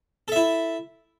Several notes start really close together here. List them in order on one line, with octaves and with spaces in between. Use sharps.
A4 E5 E4